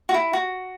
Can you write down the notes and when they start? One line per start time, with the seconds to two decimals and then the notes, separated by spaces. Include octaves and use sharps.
0.09 F#4
0.14 E4
0.33 F#4